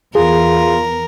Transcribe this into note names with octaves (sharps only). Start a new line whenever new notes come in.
E2 F4 G#4 A#4